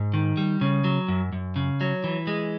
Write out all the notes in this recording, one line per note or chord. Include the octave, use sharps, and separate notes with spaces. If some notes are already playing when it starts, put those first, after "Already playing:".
Already playing: G#2
D#3
G3
C#3
F#3
F#2
F#2
C#3
F#3
E3
G#3